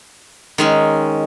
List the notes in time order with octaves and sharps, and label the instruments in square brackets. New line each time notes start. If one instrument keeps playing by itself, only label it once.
[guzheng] D#3 G#3 C#4